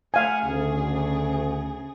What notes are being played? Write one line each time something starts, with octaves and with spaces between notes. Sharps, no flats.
A3 F5 F#5 G#5
D2 C#3 G#4